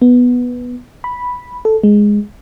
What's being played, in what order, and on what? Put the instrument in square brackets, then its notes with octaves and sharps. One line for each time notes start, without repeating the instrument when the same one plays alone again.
[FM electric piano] B3
B5
A4
G#3